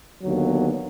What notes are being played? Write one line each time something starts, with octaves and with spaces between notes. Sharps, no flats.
D#2 D3 F#3 B3